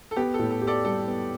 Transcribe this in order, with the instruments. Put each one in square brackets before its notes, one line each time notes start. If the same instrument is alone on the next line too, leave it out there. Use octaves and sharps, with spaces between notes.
[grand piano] A4
[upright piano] B3 [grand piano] G4
[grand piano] A4
[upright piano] A2
[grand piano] A4
[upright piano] G4
[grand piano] A4 D5
[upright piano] G3 [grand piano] A4
[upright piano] B3